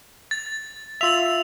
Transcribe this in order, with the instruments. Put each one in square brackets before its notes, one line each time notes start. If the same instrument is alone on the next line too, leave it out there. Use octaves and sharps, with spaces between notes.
[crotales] A6
[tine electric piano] F4 E5 [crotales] E6 F7